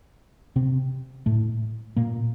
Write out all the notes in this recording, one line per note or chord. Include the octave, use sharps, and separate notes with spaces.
C3 C4
A2 A3
A#2 A#3